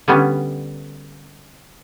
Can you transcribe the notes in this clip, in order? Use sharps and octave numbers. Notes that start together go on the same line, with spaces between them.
D3 G3 B3 C#4